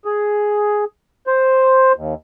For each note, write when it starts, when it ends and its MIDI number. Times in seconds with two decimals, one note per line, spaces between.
0.05 0.85 68
1.27 1.92 72
1.96 2.14 39